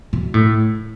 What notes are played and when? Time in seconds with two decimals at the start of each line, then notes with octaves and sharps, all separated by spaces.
0.13 B2
0.34 A2